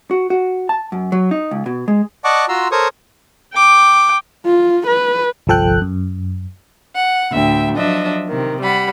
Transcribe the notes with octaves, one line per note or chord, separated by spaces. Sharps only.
F#4
F#4
A5
F#2
F#3
D#4
C#2
B2
G#3
D5 D#5 F#5 A5 C#6 D6
F4 F#4 A#5 C6 E6
A4 A#4 C5 C#5 C#6 D#6
G5 D6
F4
B4
G1 C2 F3 A4 G5 F#6
F#2
F#5
D2 A2 E5 G5
F3 F#3 D4 D#5 E5
C3 D#3
G3 F#5 B5